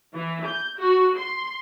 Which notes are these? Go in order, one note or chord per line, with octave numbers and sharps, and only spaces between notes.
E3
G6
F#4
C6